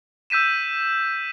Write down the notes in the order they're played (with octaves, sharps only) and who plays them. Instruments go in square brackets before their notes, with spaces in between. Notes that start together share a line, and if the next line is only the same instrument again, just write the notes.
[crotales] E6 G6 B6 D#7 E7